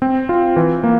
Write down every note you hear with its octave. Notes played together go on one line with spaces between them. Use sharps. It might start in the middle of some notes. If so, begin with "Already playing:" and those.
C4
F4
E3
A#3